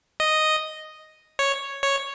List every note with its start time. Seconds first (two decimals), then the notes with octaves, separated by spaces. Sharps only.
0.20 D#5
1.39 C#5
1.83 C#5